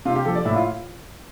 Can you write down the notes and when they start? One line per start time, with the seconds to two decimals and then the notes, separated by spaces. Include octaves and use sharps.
0.05 C3 F4
0.16 G4
0.25 F3 A4
0.35 D5
0.45 A2 E5
0.55 F4